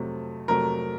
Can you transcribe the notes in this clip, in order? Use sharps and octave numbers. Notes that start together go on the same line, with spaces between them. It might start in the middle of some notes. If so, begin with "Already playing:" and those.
Already playing: F2 C3 F#3 A3
F2 C3 F#3 A3 A#4